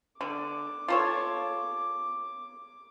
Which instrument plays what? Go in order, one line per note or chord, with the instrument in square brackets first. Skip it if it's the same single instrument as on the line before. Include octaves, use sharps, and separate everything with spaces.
[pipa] D3 [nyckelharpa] D6
[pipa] F4 A4 C#5